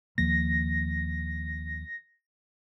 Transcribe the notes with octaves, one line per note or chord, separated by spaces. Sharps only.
D#2 F3 A#3 A#6